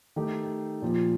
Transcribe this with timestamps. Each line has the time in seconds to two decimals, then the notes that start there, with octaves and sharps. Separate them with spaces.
0.16 D#3 A3 D#4 G4
0.82 A#2 F3 A#3